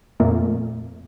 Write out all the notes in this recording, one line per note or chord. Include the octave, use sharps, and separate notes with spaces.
F2 A#2 A3 A#3